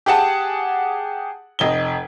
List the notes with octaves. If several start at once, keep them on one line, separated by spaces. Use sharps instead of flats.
G4 G#4 F#5 A5
F1 D#5 G7